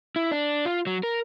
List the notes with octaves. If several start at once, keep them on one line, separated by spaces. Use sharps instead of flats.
E4
D4
F4
F#3
A#4